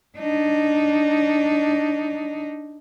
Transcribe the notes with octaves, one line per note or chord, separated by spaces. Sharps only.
D4 D#4